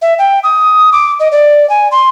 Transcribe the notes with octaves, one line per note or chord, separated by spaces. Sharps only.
E5
G5
D#6
D6
D#5
D5
G#5
C6